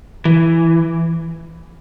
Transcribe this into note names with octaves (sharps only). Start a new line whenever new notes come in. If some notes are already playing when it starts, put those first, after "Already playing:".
E3